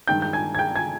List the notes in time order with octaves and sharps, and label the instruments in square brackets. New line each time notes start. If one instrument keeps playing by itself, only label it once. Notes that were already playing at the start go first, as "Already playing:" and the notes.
[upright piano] G2 D#3 G#3 G5 G6
G6
G#5 G#6
G#6
G5 G6
G#5 G#6